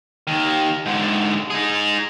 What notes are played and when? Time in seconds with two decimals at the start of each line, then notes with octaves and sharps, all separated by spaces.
0.27 D#2 D#3
0.86 G#2 D3
1.50 D#4 G#4